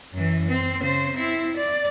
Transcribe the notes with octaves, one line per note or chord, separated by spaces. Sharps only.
F#2 E3
C4
C#3 C5
C4 E4
D5